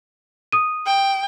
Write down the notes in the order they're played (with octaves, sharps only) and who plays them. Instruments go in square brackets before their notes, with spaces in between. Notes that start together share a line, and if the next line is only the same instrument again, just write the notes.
[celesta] D#6 D#7
[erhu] G5